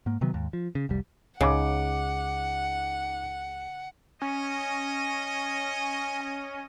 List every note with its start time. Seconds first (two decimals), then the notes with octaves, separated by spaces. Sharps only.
0.06 G#2 A#3
0.21 C3 D#3 F#3 B3
0.34 D#2 G#2
0.53 F3
0.75 C#3
0.89 F1 C2 G3
1.41 C#2 C#3 D#4 F#5 D6
4.22 C#4 C#5 D#5 G#5